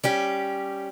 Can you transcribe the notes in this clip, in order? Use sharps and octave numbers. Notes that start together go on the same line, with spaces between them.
G3 C#4 G4